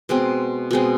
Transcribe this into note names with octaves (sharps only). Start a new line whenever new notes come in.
B2 G#3 C4
B2 G#3 C4